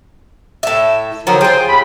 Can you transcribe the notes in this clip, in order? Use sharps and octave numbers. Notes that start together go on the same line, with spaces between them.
A2 E5
D3 D#3 F3 F#3 F#4
F4 G#4 C5 G5
D#2 B5